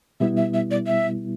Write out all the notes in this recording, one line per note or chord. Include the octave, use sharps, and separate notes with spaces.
B2 G3 B3 E4 E5
E5
E5
D5
E5